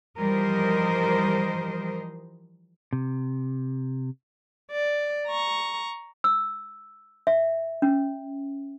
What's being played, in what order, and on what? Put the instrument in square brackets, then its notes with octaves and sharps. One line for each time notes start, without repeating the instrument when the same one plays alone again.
[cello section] E3 F3 G3 A#4 C5 D#5
[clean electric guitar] C3
[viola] D5
A#5 C#6
[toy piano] E6
E5
C#4